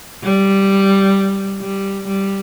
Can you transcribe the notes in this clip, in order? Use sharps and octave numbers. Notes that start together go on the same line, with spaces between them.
G3
G3
G3